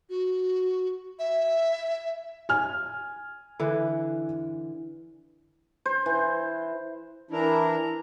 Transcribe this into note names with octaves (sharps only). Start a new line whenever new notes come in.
F#4
E5
G#5 F6
D3 E3
C5
E3
E3 D4 E4 A#4 A#5